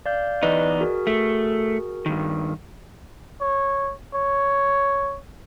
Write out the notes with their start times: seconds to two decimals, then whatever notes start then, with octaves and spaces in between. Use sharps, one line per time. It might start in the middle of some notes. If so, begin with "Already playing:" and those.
0.06 D5 F5 G6
0.43 E2 D#4 B4 D5 D#5
0.81 F#4 G#4 A#4
1.07 A3
2.06 G2 D#3
3.41 C#5
4.14 C#5